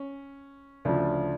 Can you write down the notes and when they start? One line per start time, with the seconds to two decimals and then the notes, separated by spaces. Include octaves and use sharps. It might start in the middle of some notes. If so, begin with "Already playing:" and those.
Already playing: C#4
0.85 D2 C#3 F3 D4